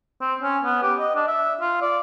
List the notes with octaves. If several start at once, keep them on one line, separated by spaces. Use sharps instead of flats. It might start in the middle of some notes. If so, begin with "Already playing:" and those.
C4
C#4
B3
G4
D#5
D4
E5
F4
D5